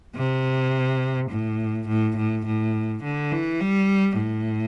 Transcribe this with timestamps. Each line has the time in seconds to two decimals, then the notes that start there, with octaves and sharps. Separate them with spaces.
0.16 C3
1.30 A2
1.88 A2
2.17 A2
2.46 A2
3.03 D3
3.32 E3
3.61 G3
4.17 A2